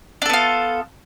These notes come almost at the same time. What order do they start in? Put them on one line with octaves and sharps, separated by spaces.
D4 A4 B3 F4